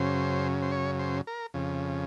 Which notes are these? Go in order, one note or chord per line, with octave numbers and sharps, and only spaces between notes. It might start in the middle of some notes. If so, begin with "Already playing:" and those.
Already playing: F#2 C#3 C5
C5
C#5
C5
A#4
F2 C#3